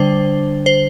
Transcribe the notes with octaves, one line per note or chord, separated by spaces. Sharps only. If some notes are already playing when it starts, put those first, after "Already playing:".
Already playing: D3 G3 D4 C5
C5